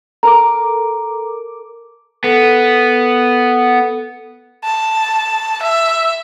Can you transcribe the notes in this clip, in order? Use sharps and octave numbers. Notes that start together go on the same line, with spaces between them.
A4 A#4 A#5 D6
B3 A4
A5
E5